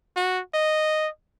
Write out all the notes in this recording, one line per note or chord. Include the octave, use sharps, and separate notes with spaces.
F#4
D#5